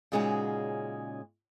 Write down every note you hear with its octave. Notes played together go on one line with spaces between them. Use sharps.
A#2 C#3 G#3 C#4 D#4 F#4